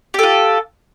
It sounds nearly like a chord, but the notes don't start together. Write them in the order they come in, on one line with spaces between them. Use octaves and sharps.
G4 A4 F4